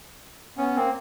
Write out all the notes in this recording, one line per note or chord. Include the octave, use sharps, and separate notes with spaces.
B3 C#4
A#3 C4